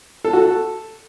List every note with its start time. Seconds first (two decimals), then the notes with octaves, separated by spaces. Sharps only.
0.24 A4
0.33 F#4
0.42 A4